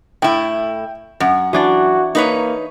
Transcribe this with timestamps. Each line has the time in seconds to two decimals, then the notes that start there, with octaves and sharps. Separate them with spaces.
0.22 A2 E4 G5
1.20 F#2 F#5
1.53 E3 D4 F#4 D5
2.15 A#3 D#4 B4 C#5